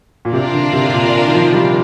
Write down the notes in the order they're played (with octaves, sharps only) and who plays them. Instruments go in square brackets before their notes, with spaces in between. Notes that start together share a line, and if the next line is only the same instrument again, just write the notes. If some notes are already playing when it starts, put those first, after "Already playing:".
[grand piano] A#2
[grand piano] C3 [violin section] D4 F4 A#4 D5
[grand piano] D3
C3
A#2
D#3
F3
G3